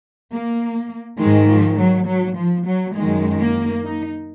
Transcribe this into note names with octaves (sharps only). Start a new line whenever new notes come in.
A#3
G#2 D#3 G#3
F3
F#3
F#3
F3
F#3
F#2 D#3 G#3
A#3
D#4